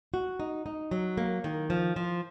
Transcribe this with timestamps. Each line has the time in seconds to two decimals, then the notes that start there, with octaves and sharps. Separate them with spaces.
0.14 F#4
0.40 D#4
0.66 D#4
0.91 F#3
1.17 A#3
1.44 D#3
1.70 F3
1.96 F3